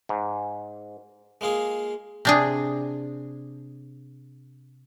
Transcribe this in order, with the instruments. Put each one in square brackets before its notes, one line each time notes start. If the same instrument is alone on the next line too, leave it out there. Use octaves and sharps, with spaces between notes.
[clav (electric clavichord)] G#2
[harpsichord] G#3 A#3 F4 G#4
[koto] C3 D4 G#4